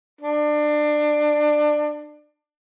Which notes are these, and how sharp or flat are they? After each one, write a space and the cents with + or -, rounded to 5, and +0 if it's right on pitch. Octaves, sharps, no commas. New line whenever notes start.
D4 +25